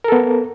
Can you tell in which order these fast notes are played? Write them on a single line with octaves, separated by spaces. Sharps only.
A#4 A4 B3